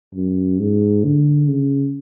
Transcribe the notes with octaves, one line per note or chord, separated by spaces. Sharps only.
F#2
G#2
D3
C#3